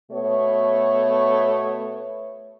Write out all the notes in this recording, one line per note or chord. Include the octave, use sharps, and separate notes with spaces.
B2 A3 B3 C#5